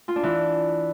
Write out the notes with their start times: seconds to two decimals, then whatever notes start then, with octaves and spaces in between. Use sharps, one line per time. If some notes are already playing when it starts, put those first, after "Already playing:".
0.08 F4
0.16 D4
0.23 E3